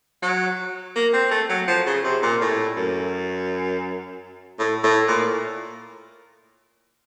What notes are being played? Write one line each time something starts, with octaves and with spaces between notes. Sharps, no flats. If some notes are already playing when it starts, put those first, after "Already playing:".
F#3
A#3
C4
A3
F#3
F3
C#3
C3
A#2
A2
F#2
A2
A2
A#2